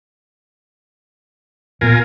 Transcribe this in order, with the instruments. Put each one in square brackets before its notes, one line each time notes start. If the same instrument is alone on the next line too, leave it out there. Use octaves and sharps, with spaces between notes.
[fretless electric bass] D1 A#2 B3 [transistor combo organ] F4 A#4 G#5